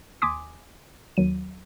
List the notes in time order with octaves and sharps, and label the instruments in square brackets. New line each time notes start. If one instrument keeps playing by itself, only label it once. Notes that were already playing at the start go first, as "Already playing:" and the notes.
[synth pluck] D#2 G#5 C6 D6 D#6 B6
D#2 D#3 F#3 D#7